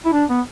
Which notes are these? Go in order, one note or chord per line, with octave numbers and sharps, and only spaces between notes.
E4
D4
B3